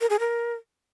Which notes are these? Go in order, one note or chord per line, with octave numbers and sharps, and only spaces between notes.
A#4
G#4
A#4